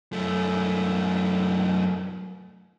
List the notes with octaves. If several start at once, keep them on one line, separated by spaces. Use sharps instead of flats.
F#2 A3